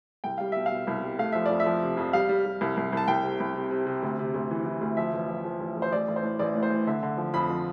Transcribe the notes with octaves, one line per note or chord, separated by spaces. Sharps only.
C2 G5
G3 F5
B2 E5
F5
B2
C2
G3
A3 F5
F3 E5
F2 D5
E5
F3
C3
F2
G3 F5
G3
G3
C2
C2
C2 A5
C2 G5
C3
C2
C3
C3
C3
D2
C3
D2
E3
E3
D2
F3 E5
A1
F3
F3
A1
A1
C5
A1 D5
A1
C5
A2
A1 D5
A2
C5
E3
D3 E5
D3
F3
F2 B5
F3